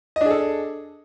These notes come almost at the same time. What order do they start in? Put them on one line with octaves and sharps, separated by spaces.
D#5 D4 G#4 A4